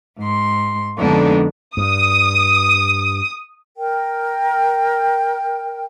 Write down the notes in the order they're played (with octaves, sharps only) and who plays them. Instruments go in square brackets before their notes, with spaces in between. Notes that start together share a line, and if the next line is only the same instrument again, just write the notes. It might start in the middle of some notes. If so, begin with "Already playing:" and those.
[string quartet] G#2 C6
F2 D3 G#3 B3 D4 D#4
[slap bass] G2 [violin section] D#6
[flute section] A#4 G5